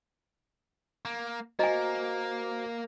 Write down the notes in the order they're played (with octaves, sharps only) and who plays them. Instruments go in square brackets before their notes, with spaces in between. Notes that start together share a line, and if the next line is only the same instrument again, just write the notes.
[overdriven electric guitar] A#3
[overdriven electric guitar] A#3 [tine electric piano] F#4 C5 A#5 [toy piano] D#5 G#5